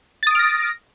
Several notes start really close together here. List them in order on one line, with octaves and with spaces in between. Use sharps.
A6 D#6 D7 F6 A#6